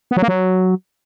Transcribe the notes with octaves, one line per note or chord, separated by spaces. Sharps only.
B3
F#3
A#3
F#3